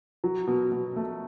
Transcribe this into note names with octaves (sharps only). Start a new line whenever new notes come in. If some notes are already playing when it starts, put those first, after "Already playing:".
F#3
B2
B2
A3